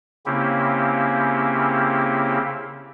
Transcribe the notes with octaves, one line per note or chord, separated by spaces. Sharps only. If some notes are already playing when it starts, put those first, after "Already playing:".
C#3 A#3 C4 C#4 E4 G4